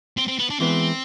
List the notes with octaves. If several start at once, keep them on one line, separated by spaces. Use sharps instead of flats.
C4
C4
B3
D4
E3 G#3 B3 C4